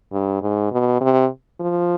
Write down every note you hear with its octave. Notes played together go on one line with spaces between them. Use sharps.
G2
G#2
B2
C3
F3